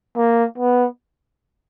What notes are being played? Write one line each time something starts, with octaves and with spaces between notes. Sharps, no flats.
A#3
B3